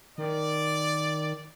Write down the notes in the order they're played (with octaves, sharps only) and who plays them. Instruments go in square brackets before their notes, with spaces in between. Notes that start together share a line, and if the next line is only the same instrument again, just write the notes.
[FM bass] D#3 [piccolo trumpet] D5